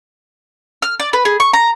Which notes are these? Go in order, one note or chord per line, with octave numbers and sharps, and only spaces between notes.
F6
D5
B4
G#4
C#6
A#5